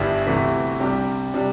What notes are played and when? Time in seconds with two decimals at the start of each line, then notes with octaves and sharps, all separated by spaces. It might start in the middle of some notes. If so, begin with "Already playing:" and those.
Already playing: G1 G2 G3 E4 G4
0.27 D2 C3 E3 A3 E4
0.80 C2 C3 G3 D4 G4
1.34 C3 G3 D4